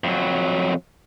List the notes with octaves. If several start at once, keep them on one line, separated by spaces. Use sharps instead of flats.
F2 F#3